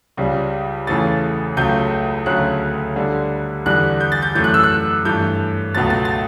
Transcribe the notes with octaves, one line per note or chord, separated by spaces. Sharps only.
C#2 C#3 G3
E2 C#3 E3 A3 A6
C#2 C#3 F#3 A3 G6
D2 C#3 F#3 A3 F#6
D2 D3 G3
E2 D3 G3 F#6
G6
A6
G6
F#2 E3 A3 G6
F#6
E6
F#6
G2 E3 A3 G6
C#2 B2 F#3 A3 A6
A6
A6